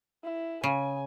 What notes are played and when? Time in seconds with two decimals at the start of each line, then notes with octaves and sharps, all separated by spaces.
0.24 E4
0.64 C#3 G#5